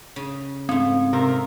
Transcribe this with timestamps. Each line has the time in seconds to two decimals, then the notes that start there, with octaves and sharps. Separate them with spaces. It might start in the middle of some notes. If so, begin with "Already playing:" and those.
0.16 C#3
0.69 G#2 A3 C4
1.13 C3 A#4